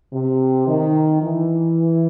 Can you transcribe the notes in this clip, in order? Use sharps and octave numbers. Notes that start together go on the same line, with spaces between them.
C3
D#3
E3